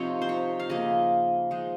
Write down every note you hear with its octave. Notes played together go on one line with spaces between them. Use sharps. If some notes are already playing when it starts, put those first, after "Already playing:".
Already playing: C3 F3 C4 D#4 C#5
C5
C#5
F5
C#3 F3 A#3 D#4 D#5
F3 G#3 D#4